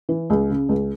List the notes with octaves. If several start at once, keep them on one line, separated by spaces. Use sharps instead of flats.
E3
C#2
C#3
C#2